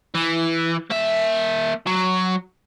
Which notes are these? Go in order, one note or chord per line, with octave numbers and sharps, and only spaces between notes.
E3
A#3 E5
F#3